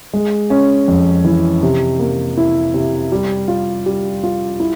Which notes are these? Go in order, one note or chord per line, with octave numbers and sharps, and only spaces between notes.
G#3
C#4
F2
E3
C3
A#3
E4
C3
G3
F4
G3
F4
E4